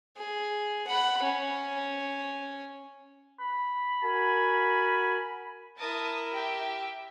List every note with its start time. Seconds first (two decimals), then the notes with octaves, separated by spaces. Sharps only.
0.17 G#4
0.87 F#5 B5
1.23 C#4
3.40 B5
4.03 F#4 A#4 G#5
5.78 E4 A#4 A5 D#6
6.33 G4 E5 G5